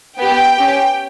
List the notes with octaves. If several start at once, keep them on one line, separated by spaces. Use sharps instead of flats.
B3 G4 G5
C#4 G4